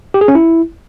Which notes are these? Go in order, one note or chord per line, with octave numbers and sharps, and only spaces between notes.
G4
G#4
C#4
E4